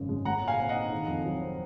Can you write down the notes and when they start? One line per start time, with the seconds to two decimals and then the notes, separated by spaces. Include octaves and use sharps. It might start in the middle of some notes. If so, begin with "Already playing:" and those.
Already playing: G#1 F#2 C#3
0.09 G#3
0.25 G#3 F#5 A#5
0.41 A#2
0.48 F5 G#5
0.59 C4
0.69 D#5 F#5
0.75 D#4
0.92 D#3
1.08 F2
1.25 F#3
1.42 C4